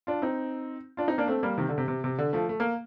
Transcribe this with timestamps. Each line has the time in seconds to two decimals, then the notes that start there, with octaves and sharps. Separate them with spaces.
0.07 D4 F4
0.22 C4 D#4
0.97 D4 F4
1.08 C4 D#4
1.18 A#3 D4
1.28 A3 C4
1.43 G3 A#3
1.58 C3 D#3
1.69 D3
1.78 C3
1.88 C3
2.04 C3
2.18 D3
2.33 F3 A3
2.49 A3
2.60 A#3